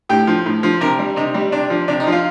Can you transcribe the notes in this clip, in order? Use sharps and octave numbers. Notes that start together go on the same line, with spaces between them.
A2 G4
F3
A2
F3
C3 A#4
G3
C3 D#4
G3
C3 D4
F3
C3 D4
D#4
F3
F4